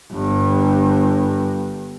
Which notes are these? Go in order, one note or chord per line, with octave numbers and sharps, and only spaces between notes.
G1 G2